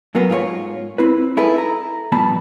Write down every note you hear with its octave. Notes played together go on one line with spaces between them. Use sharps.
F#2 F#3 A#3 B3
G#2 F4 G4 C#5
C4 E4 B4
D#4 E4 G#4 A4 B4
A#5
G2 A#2 F3 B3 A5 B5